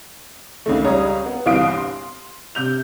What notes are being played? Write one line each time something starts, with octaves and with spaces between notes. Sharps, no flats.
C#2 D#3 A3
C#2 G3 C#5 A#5 D#6
B3
G1 C2 E3 F5 D#6 D7
C6
C3 G6 F7